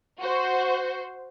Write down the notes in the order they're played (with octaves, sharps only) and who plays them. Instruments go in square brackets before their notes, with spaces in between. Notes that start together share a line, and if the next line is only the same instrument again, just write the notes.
[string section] F#4 C5